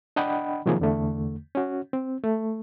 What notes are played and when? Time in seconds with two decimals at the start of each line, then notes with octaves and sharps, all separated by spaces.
0.16 D4 D#5 F#5 G5 B5
0.66 C3 D#3 F3 F#3 A#3 G#4
0.80 E2 D3 A3
1.55 C#4 F#4
1.93 C4
2.24 A3